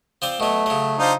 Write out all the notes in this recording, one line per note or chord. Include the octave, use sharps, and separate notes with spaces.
F3 C4 D5
B2 F#3 A3
C#3 F#3
D4 D#4 F4 C5